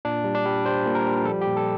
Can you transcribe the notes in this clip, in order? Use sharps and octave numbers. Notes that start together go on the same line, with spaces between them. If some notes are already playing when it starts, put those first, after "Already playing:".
A#2 D4
G3
D4
G3
G3 C5
A#2
A#4
G3
F3 A4
G4
A#2
A4